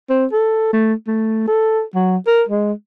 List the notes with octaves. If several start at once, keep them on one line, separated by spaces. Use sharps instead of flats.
C4
A4
A3
A3
A4
F#3
A#4
G#3